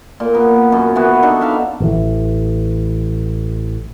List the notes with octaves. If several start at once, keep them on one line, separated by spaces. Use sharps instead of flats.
A#2
B3 A#4
F#2 C#4
E3 B3 F#4
D4 D#4 F#4 A4
E5 F5 A#5
A1 E3